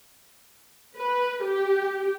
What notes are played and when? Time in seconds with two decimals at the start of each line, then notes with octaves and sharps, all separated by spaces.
0.96 B4
1.43 G4